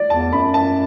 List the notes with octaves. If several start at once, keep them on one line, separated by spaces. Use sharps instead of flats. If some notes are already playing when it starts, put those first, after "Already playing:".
Already playing: D5
E2 A5
F#2 B5
A5